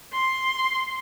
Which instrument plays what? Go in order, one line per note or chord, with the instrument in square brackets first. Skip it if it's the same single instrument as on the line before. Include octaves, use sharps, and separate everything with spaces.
[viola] C6